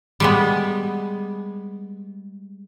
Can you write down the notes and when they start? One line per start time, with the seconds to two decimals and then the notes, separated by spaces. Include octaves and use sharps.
0.20 G3 G#3 B3